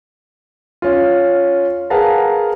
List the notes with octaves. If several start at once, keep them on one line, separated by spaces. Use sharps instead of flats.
C#4 F4
G#4 A#4 B4 F5 F#5 A5